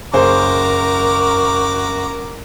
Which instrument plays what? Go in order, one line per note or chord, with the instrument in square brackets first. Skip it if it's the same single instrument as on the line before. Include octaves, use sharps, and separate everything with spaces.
[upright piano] F#1 G#4 C5 [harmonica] F#4 A#5 D6 [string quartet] A#4